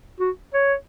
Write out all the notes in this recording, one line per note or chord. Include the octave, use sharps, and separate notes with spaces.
F#4
C#5